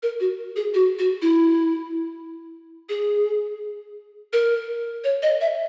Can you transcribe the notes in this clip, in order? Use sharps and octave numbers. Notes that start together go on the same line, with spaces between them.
A#4
F#4
G#4
F#4
F#4
E4
G#4
A#4
C#5
D#5
E5